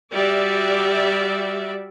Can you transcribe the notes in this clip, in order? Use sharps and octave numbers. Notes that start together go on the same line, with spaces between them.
G3 F#4 D5 E5